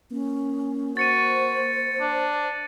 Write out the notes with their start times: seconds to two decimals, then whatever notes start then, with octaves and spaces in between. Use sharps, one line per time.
0.11 A#3 C#4
0.97 F#4 C5 A6 C#7 D#7
2.00 D4